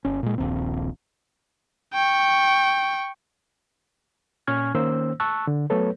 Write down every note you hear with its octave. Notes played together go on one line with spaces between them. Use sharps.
G1 C#4
A#2 G#3
D#1 A#1 D#2 C4
G5 C#6
A#2 C#4 G#5 C#6 F6 G#6
D#3 A#3 C#4 C5 E6
A5 C#6 E6 F#6
D3
F#3 A3 B3 A4 B4 C#5